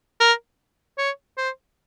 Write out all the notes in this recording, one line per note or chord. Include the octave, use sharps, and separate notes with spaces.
A#4
C#5
C5